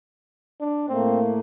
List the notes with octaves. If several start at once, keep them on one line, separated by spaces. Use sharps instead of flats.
D4
A2 A3 A#3 C4